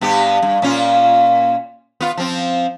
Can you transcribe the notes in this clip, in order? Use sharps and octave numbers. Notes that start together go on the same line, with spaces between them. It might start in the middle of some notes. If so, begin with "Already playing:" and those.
G2 B3 G4
G2
A#2 C#4 F4
B3 F4
F3 C4